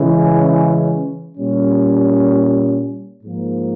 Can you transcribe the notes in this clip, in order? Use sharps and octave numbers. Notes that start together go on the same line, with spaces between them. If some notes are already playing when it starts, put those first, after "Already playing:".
Already playing: C#3 E3 G#3 C#4
A#2 G3 C#4
G#2 F3 A#3